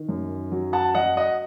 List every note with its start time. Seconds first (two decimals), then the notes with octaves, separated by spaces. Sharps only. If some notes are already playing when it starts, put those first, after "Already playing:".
Already playing: D#3
0.09 F#2
0.52 F#3
0.73 F#5 A5
0.95 F#3 D#5 F#5
1.17 D#5 F#5